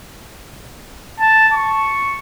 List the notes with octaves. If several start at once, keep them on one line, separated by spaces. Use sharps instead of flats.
A5
C#6